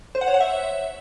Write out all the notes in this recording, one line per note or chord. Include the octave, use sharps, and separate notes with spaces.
C5
F#5
C#5
F#5
E5